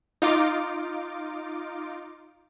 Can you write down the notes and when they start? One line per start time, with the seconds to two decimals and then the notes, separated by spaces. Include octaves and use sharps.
0.22 D#4 F4 D6